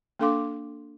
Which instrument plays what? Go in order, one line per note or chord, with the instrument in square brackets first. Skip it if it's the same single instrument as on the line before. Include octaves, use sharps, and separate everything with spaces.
[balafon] A#3 D4 A4 F5 C6 D6